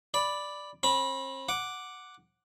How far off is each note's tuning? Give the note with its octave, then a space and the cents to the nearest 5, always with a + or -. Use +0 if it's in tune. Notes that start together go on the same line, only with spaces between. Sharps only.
D5 +0 B5 +0
C4 +40 B5 -15
F#5 +0 D6 +0